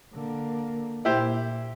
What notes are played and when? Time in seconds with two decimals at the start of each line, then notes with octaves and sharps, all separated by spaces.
0.13 D3 A#3
1.05 A#2 E4 G4 C5